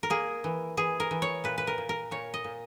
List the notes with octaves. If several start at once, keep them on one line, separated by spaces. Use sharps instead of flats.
A#4
A#3 G#4
E3
E3 G#4
A#4
E3
C#5
A#2 B4
B4
A#4
A#2
A#4
A#2 C#5
D#5
A#2